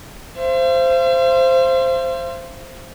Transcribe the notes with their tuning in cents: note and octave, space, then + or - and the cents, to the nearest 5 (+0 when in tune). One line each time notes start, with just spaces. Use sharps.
C5 +0 F5 -45